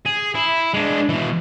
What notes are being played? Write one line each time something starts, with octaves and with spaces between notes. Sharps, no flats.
G#4
E4
G#3 D4
B2 E3